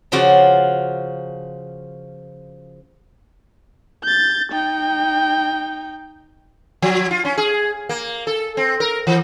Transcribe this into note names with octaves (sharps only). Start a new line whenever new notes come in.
C#3 F3 F4 F#4 D5
G6 A6
D#4 G5
F3
F4
C#4
G#4
A#3
A4
C4
A#4
E3